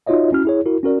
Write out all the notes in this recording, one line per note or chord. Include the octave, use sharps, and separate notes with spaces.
D#4 F4 F#4 C#5 D#5 E5
C#4 E4 F#4 F6
E4 G#4 C#5
E4 F#4 A#4
C#4 F#4 A#4 D5